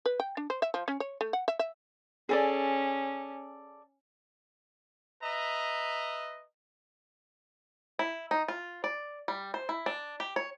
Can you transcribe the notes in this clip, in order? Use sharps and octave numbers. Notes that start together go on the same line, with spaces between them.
B4
G5
D4
C5
E5
F3
C#4
C#5
A3
F#5
E5
E5
C#4 G#4 A4 D5
B4 D#5 E5 A#5
E4
D#4
F4
D5
G3
C5
E4
D4
G4
C#5